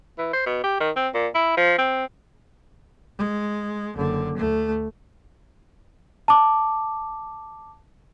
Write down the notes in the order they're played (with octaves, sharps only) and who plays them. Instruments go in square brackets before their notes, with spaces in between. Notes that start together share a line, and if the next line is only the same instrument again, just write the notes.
[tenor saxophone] E3
C5
B2
G4
D#3
C4
A#2
E4
F3
C4
[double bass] G#3
F#1 D3
D2 A3
[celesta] A5 D6